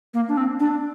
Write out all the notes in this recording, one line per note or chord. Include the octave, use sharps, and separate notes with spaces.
A#3
D4
C4
D4